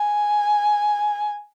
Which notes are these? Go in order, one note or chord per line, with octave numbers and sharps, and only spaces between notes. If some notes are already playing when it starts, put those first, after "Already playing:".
Already playing: G#5